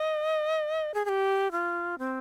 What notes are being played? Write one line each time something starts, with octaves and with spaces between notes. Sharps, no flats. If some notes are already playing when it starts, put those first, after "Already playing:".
Already playing: D#5
G#4
G#4
G4
F4
C4